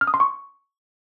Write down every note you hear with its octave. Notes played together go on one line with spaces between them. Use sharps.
F6
D#6
C6
C#6